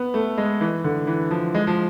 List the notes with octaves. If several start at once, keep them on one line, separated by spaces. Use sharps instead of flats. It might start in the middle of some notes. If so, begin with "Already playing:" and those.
Already playing: B3
A3
G#3
E3
D3
E3
F3
G#3
F3